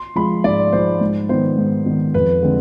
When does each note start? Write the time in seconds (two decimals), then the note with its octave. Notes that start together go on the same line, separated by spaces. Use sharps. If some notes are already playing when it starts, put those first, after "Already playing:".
Already playing: C6
0.16 F3 G#3 B5
0.44 G#2 D5
0.73 F3 G#3 C5
1.01 G#2
1.29 D#3 B3 C5
1.58 G#2
1.86 D#3 B3
2.14 F2 B4
2.42 D3 G#3 C4